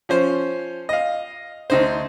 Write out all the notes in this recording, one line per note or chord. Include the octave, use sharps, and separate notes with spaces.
F3 C#4 C5
D#5 F5
D2 D#4 C5